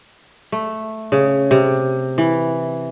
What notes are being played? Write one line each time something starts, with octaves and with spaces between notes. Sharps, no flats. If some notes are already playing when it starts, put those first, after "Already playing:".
A3
C#3
C3
E3